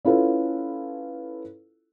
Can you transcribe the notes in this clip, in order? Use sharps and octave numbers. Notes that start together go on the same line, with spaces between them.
C#4 E4 F4 A4 B4